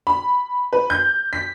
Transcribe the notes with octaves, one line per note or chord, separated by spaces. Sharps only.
B5
B4
G6
B6